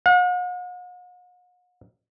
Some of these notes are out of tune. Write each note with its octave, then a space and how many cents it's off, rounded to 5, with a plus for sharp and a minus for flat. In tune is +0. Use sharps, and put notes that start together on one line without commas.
F#5 -45